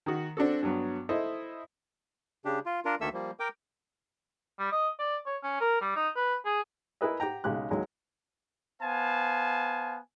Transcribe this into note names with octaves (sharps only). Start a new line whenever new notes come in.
D#3 F#4
C4 D4 F#4 A4
G2 F#3 B3
E4 A4 C5 D#5
C#3 D4 G4
F4
D4 F4 A#4
D2 D#3 A#3 A4 E5 E6
F3 G3 A#3
A#4 G5 D6
G3
D#5
D5
C#5
C#4
A#4
G3
D#4
B4
G#4
E4 G#4 A#4 B4 D#5 E5
G4 F#5 G5 A#5
B1 C#3 G#3 G4 F#6
D#2 F#3 G#3
B3 C5 F5 G#5 A5